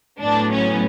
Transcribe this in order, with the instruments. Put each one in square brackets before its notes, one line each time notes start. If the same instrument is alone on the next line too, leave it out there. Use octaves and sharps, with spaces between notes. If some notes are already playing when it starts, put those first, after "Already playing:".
[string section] A2 F#3 B3 D4
C#4